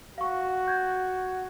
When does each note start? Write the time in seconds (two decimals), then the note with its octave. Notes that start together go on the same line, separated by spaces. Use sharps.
0.18 F#4 F5 C#6
0.68 G6 G#6